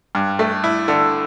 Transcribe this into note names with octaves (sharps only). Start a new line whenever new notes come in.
G2
A3
E4
D3